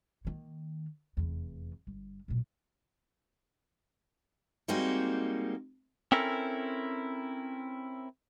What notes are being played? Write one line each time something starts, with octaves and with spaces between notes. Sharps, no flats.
D#3 A#3
F1 E2
G1
B1 A#2
G3 G#3 A#3 C4 D#4 F#4
C4 C#4 E4 A4 A#4